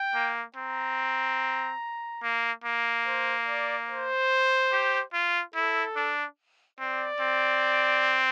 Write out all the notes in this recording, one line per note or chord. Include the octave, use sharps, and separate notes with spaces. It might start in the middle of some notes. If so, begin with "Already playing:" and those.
Already playing: G5
A#3
C4 A#5
A#3
A#3
C5
D5
C5
G4
F4
E4 A4
D4
C4 D5
C4